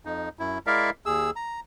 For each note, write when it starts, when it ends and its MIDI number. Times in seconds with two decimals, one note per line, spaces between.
0.05 0.29 41
0.05 0.29 63
0.39 0.58 42
0.39 0.58 64
0.67 0.90 56
0.67 0.90 64
0.67 0.90 70
0.67 0.90 74
0.67 0.90 76
0.67 0.90 77
1.06 1.30 39
1.06 1.30 68
1.06 1.30 88
1.36 1.60 82